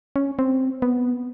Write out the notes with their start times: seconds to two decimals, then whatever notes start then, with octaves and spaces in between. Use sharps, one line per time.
0.16 C#4
0.39 C4
0.82 B3